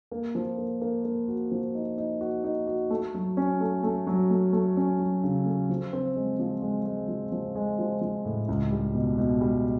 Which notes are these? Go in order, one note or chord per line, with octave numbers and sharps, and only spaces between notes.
A#3
F3
A#3
A#3
A#3
F#4
F3
D#4
D#4
F#4
D#4
F#4
A3
F#3
C#4
A3
A3
F#3
A3
A3
C#4
F#3
C#3
A3
F3
C4
G#3
F3
G#3
G#3
F3
F3
G#3
F3
F3
A2
C#2
G3
B2
B2
G3